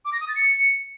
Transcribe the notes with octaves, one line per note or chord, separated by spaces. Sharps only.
D6
A#6
D#6
A6
C#7